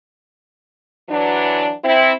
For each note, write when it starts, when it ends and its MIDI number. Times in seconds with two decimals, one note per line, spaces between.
1.09 1.72 52
1.09 1.72 54
1.09 1.72 62
1.84 2.12 60
1.84 2.12 64